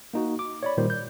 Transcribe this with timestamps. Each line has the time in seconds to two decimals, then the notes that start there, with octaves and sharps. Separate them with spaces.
0.14 A#3 D#4 F#4
0.39 D6
0.63 C#5 D5 B5
0.77 A#2 D#3 G3 C5
0.90 G6